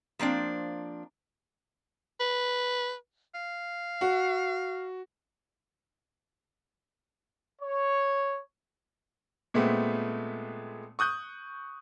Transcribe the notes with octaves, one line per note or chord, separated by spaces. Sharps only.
F3 A#3 C4 D4
B4
F5
F#4
C#5
A#2 G#3 A3 B3 C4
C#6 D#6 F#6 G6